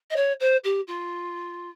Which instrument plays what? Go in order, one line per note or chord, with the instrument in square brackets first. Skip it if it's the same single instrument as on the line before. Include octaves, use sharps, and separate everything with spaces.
[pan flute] D#5
C#5
C5
G4
F4